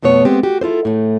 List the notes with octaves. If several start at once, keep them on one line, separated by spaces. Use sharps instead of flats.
F2 B2 A3 B3 C#5
G#3 B3 C4 G4
F#4 G4
E4 F4 A4 C5
A2 A3